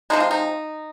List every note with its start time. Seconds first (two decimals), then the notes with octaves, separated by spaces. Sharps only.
0.10 C3 F3 G#3 D#4
0.20 F4
0.31 D#4